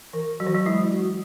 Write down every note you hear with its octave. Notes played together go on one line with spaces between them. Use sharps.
E3 A#4
F#3 F#4
E3
F#3
G#3 E4
F#4